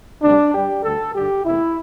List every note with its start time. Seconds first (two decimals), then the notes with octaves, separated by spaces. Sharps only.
0.22 D2 C3 G3 D4
0.53 G2 G3 G4
0.83 D2 D3 G3 A4
1.14 G2 D3 G3 G4
1.44 E2 C3 E3 A3 E4